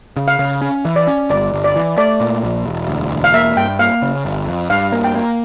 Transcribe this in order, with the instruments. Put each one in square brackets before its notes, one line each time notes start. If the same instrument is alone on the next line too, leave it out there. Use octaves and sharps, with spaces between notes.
[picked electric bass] C#3
[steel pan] F5
[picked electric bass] C#3
C#4
E3
[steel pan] D5
[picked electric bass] C#4
[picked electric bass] G1 [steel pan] D5
[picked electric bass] G1
[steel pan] D5
[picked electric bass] E3
[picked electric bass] A3 [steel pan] D5
[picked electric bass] A#2
A#1
E1
D2
E1
[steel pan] F5
[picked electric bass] A#3 [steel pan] E5
[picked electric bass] G2 [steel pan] G5
[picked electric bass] A#3 [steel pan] F5
[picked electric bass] C#3
G1
F2
[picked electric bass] G2 [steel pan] F5
[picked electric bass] A#3
[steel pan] G5
[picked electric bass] A#3